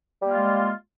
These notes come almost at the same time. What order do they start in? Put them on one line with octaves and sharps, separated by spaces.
G3 A#3 F4 G#3